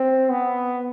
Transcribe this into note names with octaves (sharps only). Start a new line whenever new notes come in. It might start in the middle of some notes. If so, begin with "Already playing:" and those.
Already playing: C4
B3